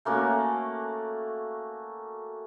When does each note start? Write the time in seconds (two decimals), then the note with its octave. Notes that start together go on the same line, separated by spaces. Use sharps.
0.05 A3 A#3 C#4 F#4